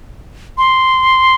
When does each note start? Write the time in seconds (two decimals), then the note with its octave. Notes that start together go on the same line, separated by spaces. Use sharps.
0.58 C6